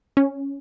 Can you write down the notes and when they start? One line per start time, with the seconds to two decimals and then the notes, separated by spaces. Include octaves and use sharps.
0.17 C#4